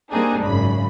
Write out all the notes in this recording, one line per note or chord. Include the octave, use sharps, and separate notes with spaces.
G3 A#3 C4 D4 D#4 G#4
G#1 F#2 C#3 B5